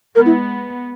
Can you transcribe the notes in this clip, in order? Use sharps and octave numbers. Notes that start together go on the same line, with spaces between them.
G#3 B3 A#4
E4